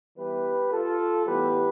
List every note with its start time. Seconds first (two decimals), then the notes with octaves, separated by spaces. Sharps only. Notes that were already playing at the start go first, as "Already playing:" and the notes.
0.17 E3 G3 B3 G4 B4
0.71 F4 A4
1.26 A2 E3 G3 B3 G4 B4